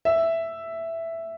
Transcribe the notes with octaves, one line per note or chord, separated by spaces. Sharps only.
E5